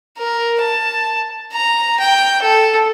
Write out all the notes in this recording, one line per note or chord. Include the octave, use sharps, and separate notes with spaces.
A#4
A5
A#5
G5
A4